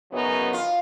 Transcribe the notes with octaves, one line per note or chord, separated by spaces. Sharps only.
F#2 C#3 F#3 B3 D#4
F4